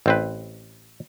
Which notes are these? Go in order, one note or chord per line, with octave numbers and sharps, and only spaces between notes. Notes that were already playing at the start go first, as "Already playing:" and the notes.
A1 C4 B4